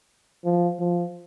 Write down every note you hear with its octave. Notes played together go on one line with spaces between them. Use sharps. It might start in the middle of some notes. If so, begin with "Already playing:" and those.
F3
F3